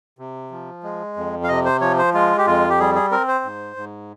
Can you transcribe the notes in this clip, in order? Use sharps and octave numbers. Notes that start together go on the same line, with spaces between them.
C3
F3
G#3
F2
F5
C3 D#5
C5
F3 C#5
C5
G#3 F4
G4
F2 F4
G4
G3 G#4
G#4
C4 A#4
C5
G#2
G#2